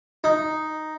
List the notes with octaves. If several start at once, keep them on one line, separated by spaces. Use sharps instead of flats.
D#4